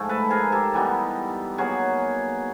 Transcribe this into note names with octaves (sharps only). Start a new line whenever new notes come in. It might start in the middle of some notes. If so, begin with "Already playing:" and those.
Already playing: G#2 F3 A3
A4 B4
G#4 A#4
G4 A4
E3 G3 B3 D#4
B2 F#3 A#3 F#4 G#4